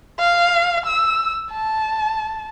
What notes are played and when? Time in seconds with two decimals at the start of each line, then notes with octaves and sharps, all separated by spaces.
0.19 F5
0.86 E6
1.52 A5